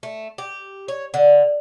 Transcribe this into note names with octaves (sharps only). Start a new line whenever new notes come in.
A3
G4
C#5
D3